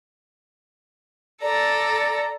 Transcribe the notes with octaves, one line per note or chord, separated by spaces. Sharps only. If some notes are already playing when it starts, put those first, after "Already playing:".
A4 D5 A#5